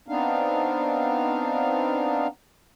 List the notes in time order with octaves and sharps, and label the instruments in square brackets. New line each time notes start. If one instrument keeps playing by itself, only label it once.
[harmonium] B3 C4 D4 D#4 F5